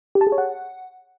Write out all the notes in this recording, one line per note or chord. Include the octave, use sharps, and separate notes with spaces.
G4
A5
G#4
C#5
F#5